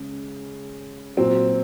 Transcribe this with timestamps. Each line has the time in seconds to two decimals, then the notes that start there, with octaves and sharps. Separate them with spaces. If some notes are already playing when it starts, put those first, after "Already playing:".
Already playing: C#3 G#3 C#4
1.17 A#2 F#3 C4